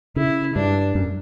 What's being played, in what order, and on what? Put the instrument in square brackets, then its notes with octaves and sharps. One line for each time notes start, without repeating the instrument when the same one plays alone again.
[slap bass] C#3 [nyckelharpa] E4
[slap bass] G2 [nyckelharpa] D4
[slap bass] F#2